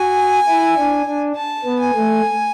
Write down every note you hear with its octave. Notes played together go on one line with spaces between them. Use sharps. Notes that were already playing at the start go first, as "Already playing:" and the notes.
Already playing: F#4 G#5
E4
D4
D4
A5
B3
G#5
A3